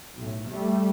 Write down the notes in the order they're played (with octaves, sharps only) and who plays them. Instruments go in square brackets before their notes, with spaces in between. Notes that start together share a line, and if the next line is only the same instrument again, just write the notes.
[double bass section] B1 A2
G3 A3